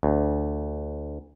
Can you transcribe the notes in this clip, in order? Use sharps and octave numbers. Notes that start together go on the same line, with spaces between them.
D2